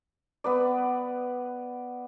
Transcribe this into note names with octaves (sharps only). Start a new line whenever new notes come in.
B3 B4 D5